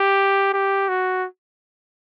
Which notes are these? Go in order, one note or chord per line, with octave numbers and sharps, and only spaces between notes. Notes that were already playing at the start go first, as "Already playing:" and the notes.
Already playing: G4
G4
F#4